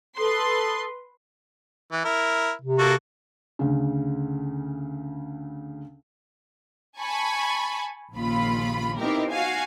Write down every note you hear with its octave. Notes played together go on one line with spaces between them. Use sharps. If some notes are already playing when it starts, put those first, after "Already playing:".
A4 B4 C6 D#6
E3
E4 A#4
C3
A#3 F#4 A4
D2 C#3
G#5 A5 B5 C#6
A#1 D#2 C#3 F4 B5
B3 C4 D#4 E4 G4 A#4
F#4 F5 G#5